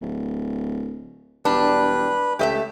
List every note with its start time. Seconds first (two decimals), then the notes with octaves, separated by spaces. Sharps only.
0.01 D1
1.45 E1 G3 D4 B4
2.39 C#2 A3 G4 D#5 E5